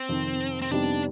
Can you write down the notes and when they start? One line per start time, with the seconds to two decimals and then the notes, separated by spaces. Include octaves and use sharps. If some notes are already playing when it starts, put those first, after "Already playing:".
Already playing: C4
0.09 F2 C3 D#3
0.62 C4
0.71 F2 C3 G3 B3 D4 D#4